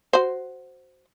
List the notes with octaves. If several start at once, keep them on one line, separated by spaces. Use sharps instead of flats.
F#4 C5